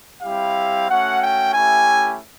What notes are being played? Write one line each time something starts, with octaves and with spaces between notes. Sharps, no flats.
G3 C4 E4 G4 F5
A3 C#4 F#4 F#5
G5
A3 C#4 E4 G4 G#5